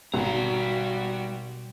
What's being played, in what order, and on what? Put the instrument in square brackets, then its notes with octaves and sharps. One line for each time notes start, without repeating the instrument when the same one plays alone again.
[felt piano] G#1 [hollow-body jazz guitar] B2 [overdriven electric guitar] G3 A#5 [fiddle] F#4